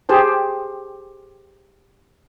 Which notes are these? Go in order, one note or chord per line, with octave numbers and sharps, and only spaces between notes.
G4 G#4 C5 A5